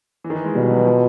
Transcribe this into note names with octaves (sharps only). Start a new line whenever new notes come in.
E3
D#3
E3
G#3
B2 G3
F#3
F3